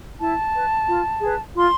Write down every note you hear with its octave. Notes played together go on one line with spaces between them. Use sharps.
E4 A5
B4
F4
G#4 B4
F4 C6